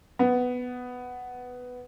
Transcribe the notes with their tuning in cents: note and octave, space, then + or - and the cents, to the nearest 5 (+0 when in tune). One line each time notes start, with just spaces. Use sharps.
B3 +5